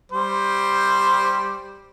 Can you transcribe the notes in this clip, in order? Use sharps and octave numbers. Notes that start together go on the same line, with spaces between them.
G3 C5